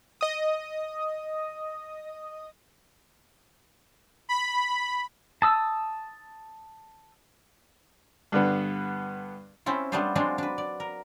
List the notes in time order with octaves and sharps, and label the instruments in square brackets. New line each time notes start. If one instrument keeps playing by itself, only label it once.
[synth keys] D#5 D#6
[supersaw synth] B5
[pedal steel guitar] A5 D#6 E6
[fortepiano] G2 D3 B3
[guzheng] C4 C#4 E4 F4
G3 A3 B3 D4 F4 C5
F#3 G#3 C4 D4 F4
D4 B4
D5
A#4